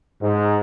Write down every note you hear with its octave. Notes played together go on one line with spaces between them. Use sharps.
G#2